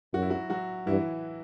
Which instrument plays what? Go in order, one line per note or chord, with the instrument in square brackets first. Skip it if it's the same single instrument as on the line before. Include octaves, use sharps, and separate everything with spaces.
[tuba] F#2 [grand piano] F#4
[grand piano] E4
F#3 F#4
F#3 F#4
[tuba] G2 [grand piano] E3 E4